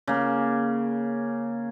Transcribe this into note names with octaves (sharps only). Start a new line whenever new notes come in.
C#3 A#3